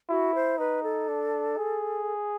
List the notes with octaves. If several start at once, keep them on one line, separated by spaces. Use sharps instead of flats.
E4 F#4
C5
D#4 B4
A4
D4
G#4